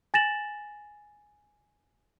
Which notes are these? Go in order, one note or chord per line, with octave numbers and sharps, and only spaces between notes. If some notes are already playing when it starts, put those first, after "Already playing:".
G#5 A6 A#6 E7 F#7